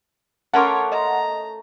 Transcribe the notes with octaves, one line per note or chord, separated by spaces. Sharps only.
A3 C#4 A#4 C#5 F#5 A5 C6 D6
D#5 A#5